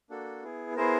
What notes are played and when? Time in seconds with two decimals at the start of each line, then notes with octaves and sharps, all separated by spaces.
0.10 A#3 D4 F#4 A4
0.43 B3 E4 G#4
0.76 B3 E4 G#4 A#4 C5